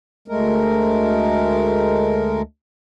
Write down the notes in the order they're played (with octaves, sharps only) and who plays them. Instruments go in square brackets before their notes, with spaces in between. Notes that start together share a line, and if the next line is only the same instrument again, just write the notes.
[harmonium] D2 G#3 A3 A#4